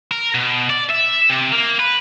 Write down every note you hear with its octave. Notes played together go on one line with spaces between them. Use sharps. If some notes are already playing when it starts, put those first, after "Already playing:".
A#4
B2
D5
E5
C3
A#3
B4